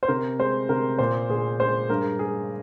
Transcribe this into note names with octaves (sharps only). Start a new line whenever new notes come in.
C5
C3 A#4
G#3 C5
C3 A#4
A#2 C5
A#2 G#4
G#3 C5
G2 A#4
G#3 G#4